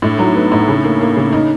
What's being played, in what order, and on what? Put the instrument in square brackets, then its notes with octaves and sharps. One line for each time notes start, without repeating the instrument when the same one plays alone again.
[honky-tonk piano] A2 [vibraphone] D4
[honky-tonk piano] F#3 [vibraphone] D#4
[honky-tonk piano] B3 [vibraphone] D#4
[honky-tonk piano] A2
C#3
A#3
A#3
C#3
D#4